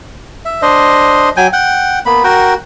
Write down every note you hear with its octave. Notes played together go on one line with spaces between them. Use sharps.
E5
D4 C5 D#5
F#3 G5 G#5
F#5 G5
A#3 B3 B5
F#4 A#4 F#5 G5